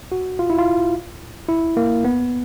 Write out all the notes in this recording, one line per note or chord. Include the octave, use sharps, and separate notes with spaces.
F#4
F4
E4
F4
E4
A#3
B3